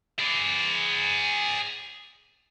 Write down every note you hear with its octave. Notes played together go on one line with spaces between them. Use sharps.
G#4 D5